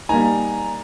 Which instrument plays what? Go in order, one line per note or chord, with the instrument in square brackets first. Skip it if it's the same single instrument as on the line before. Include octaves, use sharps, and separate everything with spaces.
[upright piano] G3 A#3 D#4 [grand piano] G#5 A#5